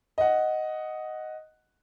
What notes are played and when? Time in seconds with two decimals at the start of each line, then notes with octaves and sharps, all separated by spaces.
0.18 D#5 F#5